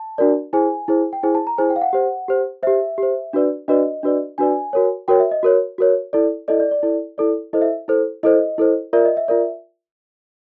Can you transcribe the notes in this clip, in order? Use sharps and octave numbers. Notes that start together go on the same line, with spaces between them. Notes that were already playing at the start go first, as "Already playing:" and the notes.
Already playing: A5
D4 F#4 A#4 D5
E4 G#4 C5 G#5
E4 G#4 C5
G5
E4 G#4 C5 G#5
A5
A#5
E4 G#4 C5 G#5
G5
F5
F#5
G4 C5
G4 C5
G4 C5 E5
G4 C5
D4 F#4 B4 D5
D4 F#4 B4 D5 D#5
D4 F#4 B4 D5
D4 F#4 B4 D5 G#5
F#4 A#4 C#5
F#4 A#4 C#5 G5
E5
D#5
F#4 A#4 C#5
F#4 A#4 C#5
E4 A4 D5
E4 A4 D5 D#5
D5
D5
E4 A4 D5
E4 A4 D5
E4 A4 C5 D#5
E5
E4 A4 C5
E4 A4 C5 D#5
E4 A4 C5
F4 A#4 D5 E5
D#5
E5
F4 A#4 D5